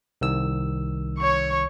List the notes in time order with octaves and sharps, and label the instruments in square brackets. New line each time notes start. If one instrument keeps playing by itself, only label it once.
[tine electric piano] C2 D#3 E6
[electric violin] C#5 C#6